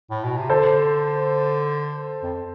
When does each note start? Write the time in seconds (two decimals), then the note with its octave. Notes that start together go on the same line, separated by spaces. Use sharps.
0.10 A2
0.24 B2
0.37 C3
0.50 D3 A4 C5
2.23 F2